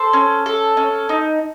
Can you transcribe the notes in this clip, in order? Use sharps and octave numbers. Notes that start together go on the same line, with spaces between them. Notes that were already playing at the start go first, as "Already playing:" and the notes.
Already playing: A4 C5
C#4
A4
C#4
D#4